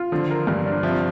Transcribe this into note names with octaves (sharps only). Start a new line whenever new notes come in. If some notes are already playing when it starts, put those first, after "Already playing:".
Already playing: F4
D3 F3
A#4
G2
D4
C3 F3